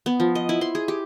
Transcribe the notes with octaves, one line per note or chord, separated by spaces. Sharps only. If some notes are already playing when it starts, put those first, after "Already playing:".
B3
F3
D#5
E4
C6
G#4
G4